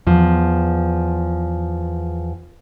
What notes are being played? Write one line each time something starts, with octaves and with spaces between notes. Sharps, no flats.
E2 F3